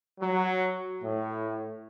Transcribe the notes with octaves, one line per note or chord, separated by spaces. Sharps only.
F#3
A2